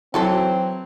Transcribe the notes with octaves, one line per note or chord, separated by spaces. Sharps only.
E3 F#3 C4 F#4 A4 C5